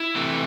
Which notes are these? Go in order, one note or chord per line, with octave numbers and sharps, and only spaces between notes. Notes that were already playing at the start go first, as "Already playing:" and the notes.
Already playing: E4
C3 E3 A3